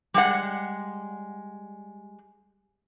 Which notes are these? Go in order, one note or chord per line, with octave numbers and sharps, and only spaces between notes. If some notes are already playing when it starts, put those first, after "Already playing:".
G3 G#3 F#5